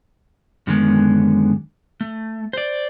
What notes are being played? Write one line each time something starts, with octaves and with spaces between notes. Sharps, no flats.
F#2 D3 D#3 G#3 B3
A3
C5 D5